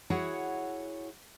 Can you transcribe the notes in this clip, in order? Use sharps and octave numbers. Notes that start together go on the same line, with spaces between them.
E4 F#4 G#4 C#5 F#5